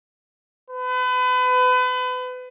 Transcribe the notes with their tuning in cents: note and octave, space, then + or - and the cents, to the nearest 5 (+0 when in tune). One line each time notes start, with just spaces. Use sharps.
B4 +35